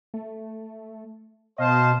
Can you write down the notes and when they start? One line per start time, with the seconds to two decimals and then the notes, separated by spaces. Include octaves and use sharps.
0.14 A3
1.58 B2 C5 D#5 F5 A5